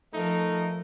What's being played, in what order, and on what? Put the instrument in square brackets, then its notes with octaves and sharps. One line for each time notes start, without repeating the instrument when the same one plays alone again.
[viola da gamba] F3 A#4 [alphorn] A3 [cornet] D#4